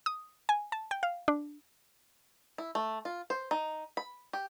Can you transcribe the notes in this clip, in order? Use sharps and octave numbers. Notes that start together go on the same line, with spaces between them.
D#6
G#5
A5
G5
F5
D4
E4
A3
F4
C5
D#4
B5
G4